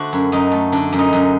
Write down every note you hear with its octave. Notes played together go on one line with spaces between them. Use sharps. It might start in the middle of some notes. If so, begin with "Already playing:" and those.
Already playing: D3 A3 F#4 C5
F#2
F#2 D#4
A3
D3 D4
F#2
D#4
F#2